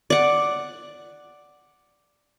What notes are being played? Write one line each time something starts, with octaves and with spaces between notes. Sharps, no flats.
D5 F#5